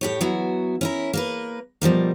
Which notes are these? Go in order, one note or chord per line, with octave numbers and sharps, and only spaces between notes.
A2 G4 C#5
F#3 B3 E4 F#4
C#4 E4 A#4
A#3 A#4 B4
B2 F3 G3 A#3